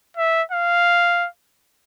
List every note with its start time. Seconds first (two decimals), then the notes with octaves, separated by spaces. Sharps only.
0.17 E5
0.52 F5